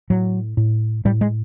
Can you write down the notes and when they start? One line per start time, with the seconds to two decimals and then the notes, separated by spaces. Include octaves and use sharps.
0.10 A2 F#3
0.57 A2
1.05 A2 G3
1.21 G#3